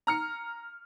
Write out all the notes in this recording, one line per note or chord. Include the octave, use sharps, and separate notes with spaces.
A#5 F6 C#7